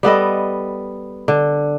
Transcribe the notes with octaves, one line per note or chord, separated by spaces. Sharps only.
G3 B3 A4 D#5
D3